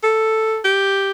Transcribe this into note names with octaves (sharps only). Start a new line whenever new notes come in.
A4
G4